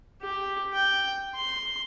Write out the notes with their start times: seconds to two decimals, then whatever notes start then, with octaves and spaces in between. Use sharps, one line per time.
0.22 G4
0.73 G5
1.35 C6